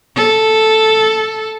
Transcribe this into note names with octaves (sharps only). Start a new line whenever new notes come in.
A4